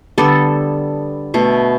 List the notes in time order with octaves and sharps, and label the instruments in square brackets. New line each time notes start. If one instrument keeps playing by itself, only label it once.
[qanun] D3 G3 B3 A4
B2 A3